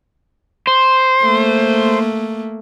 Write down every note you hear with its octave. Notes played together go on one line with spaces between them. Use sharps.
C5
A3 A#3